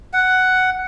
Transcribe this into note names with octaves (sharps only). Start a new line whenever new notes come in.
F#5